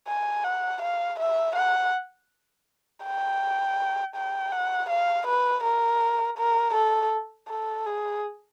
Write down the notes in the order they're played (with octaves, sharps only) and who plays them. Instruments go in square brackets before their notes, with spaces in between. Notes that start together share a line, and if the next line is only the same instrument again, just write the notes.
[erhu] G#5
F#5
F5
E5
F#5
G5
G5
F#5
F5
B4
A#4
A#4
A4
A4
G#4